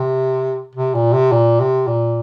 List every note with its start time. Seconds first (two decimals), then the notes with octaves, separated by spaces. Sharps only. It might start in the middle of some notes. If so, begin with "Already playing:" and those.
Already playing: C3
0.75 C3
0.95 A#2
1.13 C3
1.32 A#2
1.60 C3
1.88 A#2